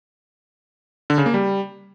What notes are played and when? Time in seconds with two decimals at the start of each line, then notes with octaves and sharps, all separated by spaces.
1.10 D3
1.18 C#3
1.26 A#3
1.34 G3